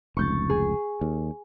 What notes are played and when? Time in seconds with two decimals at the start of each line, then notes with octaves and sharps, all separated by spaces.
0.17 F1 C#2 C#6 G6 A6
0.50 G#4
1.01 D#2